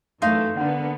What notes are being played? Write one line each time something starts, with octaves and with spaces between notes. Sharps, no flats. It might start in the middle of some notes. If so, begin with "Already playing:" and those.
F#2 E3 A3 D#4 F5 C6
D3 A#3 B3 D4 F#5